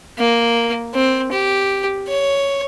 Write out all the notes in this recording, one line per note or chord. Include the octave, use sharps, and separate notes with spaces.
A#3
C4
G4
C#5